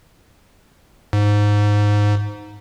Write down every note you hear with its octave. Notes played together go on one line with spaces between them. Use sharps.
G#2